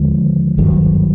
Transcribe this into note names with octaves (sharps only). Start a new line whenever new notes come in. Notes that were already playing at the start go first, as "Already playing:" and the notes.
Already playing: D#2 D3 F3 G#3
G#1 G2 D#3 F#3